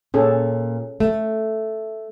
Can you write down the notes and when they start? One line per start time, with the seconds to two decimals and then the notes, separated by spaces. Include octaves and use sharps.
0.14 A#2 C#4 G#4 A4
1.00 A3